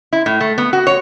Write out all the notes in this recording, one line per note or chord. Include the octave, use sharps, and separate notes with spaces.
E4
A2
A3
B3
F#4
C#5